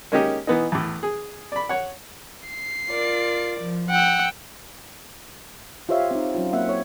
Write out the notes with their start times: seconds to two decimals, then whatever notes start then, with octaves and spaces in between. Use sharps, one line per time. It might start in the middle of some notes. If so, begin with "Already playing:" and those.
0.12 G#3 A#3 C#4 D#4 G4
0.47 E3 B3 D#4
0.72 E2 A2
1.03 G#4
1.52 D5 B5
1.69 C#5 F#5
2.49 C7
2.88 F4 A#4 D5
3.60 F3
3.90 F#5 G5 E6
5.89 F4 G4 C5 C#5 E5 F5
6.11 C4 D#4
6.35 F#3 C#4 F4
6.53 A#3 C4 E5 F#5
6.69 C#5